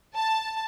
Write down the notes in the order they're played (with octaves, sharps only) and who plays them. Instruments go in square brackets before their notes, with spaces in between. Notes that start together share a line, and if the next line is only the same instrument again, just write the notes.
[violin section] A5